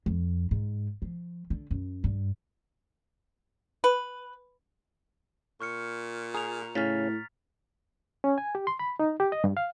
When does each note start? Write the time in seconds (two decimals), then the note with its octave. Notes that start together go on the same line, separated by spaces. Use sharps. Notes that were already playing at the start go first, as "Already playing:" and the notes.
0.06 F2
0.51 G#2
1.02 F3
1.50 D3
1.71 F#2
2.04 G2
3.84 B4
5.60 A#2 C#6 F6 C#7
6.34 G#4 A#5 F7
6.75 A2 C#3 C#4 F6 A6 B6
8.24 C#4
8.38 G#5
8.55 G4
8.67 C6
8.79 B5
9.00 D#4
9.20 G4
9.32 D#5
9.44 G2
9.57 F5